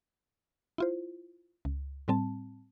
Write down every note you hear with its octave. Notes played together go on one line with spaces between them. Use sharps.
E4 F4 C5
C#2
A2 G3 C4 A5